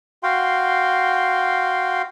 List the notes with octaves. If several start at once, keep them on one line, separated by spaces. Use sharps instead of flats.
F#4 F5 G5 C6